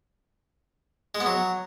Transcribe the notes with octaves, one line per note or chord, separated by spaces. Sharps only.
G#3
B3
F#3